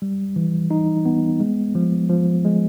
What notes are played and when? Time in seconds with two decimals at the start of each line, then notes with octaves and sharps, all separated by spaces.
0.02 G3
0.36 E3
0.71 D#4
1.05 B3
1.40 G#3
1.75 F3
2.10 F3
2.45 G#3